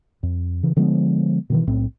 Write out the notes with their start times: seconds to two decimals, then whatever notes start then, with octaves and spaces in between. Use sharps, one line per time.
0.23 F2
0.63 C#3 E3
0.76 D3 F3 G#3 B3
1.50 B2 D#3 E3
1.67 B1 A2 C4